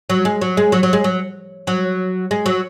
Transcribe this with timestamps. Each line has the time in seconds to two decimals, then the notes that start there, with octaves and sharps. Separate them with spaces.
0.10 F#3
0.25 G#3
0.42 F#3
0.57 G#3
0.72 F#3
0.83 F#3
0.93 G#3
1.04 F#3
1.67 F#3
2.31 G#3
2.46 F#3